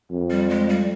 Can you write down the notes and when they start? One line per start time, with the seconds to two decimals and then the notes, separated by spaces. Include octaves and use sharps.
0.11 F2
0.30 G3
0.50 G#3
0.69 G3